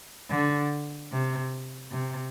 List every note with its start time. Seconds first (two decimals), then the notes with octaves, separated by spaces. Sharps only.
0.31 D3
1.12 C3
1.92 C3